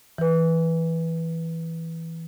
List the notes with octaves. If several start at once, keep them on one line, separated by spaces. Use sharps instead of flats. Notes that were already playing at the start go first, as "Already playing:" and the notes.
E3 B4